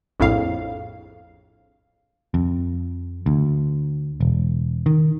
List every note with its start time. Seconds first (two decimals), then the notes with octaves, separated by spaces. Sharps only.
0.20 A#1 F2 A2 F5
2.34 F2
3.26 D2
4.20 E1
4.86 D#3